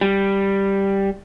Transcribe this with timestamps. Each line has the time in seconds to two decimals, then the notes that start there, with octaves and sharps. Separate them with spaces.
0.01 G3